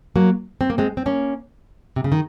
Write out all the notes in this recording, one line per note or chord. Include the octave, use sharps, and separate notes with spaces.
F#3 A#3
C4
A#3
G#3 C4
C4
A#3 C#4
C3
C#3
D#3